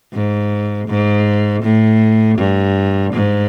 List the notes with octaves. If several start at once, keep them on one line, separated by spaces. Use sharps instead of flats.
G#2
G#2
A2
G2
G#2